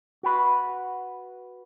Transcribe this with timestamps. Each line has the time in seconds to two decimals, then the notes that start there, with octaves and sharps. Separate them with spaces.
0.23 F#4 B4